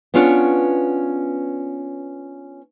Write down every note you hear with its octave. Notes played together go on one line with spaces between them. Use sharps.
B3 C#4 D4 F4 C#5